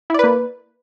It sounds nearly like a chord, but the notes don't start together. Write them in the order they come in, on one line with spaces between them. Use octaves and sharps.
E4 D5 B4 A#3